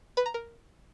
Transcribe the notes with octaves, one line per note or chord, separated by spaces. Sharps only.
B4
A#5
A#4